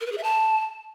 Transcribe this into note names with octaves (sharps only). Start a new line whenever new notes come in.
A#4
B4
G#4
E5
A5